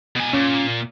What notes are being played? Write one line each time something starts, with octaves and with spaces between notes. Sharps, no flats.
B2 G#5
A#2 C#4